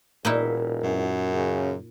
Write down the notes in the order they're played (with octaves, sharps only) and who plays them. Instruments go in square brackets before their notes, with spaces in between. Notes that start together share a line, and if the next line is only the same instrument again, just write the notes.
[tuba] E1 [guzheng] A#2 D#4 E4
[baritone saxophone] F#2
[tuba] C#3